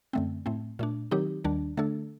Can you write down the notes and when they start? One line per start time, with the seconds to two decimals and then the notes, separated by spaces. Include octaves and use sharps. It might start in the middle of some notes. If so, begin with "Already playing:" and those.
0.13 F#2 D3 A3 C4
0.46 A2 A3 C4
0.79 A#2 A3 D4
1.11 D#3 F#3 C4 D#4 G4
1.44 D#2 D#3 G3 D4
1.77 D3 A3 D4 A4